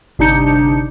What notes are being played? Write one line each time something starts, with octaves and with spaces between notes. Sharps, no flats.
G1 C3 D4 D#4 G6 C#7